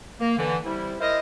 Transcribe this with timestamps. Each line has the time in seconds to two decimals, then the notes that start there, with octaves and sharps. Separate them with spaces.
0.20 A#3
0.37 D3 E3
0.65 C3 G3 E4
1.00 E4 A#4 C5 D#5